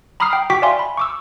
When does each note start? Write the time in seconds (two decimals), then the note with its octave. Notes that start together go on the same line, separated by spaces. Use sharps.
0.20 A#5 B5 D6 D#6 F6 C7
0.33 G5
0.50 F#4 G5 C#6 D6 B6
0.62 D5 E5 F5 G#5 C6
0.79 B5
0.97 C#6 D6 E6